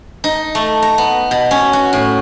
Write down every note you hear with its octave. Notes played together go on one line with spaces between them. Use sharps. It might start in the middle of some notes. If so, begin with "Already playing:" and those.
D#4
A3
A#5
B3
B2
C#4
F#4
A2